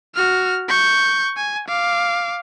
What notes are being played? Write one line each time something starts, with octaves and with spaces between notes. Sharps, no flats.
F#4 F6
C#6 G6
G#5
F5 D6